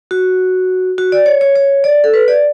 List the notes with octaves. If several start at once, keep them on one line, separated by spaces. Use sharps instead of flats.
F#4
F#4
D5
C#5
C#5
C#5
D5
A4
B4
D5